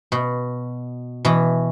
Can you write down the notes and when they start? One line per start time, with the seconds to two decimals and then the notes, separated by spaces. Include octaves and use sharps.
0.12 B2
1.25 B2 E3